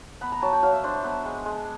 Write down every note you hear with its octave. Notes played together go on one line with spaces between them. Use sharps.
B3 B5
A#5
F#3 A5
G5
F#3 F5
E5
D4 C5
C5
B3
G#3
G#3